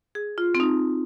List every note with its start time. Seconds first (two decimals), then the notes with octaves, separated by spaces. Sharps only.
0.15 G#4
0.38 F4
0.55 C4
0.60 D#4